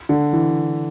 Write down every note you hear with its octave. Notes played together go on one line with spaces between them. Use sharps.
D3
E3